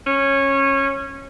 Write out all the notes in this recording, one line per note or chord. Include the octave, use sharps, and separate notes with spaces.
C#4